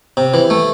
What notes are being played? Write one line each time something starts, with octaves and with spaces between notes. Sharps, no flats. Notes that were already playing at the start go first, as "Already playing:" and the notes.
C3
E3
A3